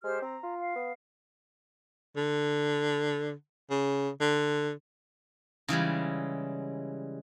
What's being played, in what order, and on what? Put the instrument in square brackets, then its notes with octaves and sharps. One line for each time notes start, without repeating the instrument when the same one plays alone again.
[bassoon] G#3 [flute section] G4 C5 F6
[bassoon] C4 [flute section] A#5
[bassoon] F4
[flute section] F5
[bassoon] B3
[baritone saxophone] D3
C#3
D3
[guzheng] C#3 E3 G3 G#3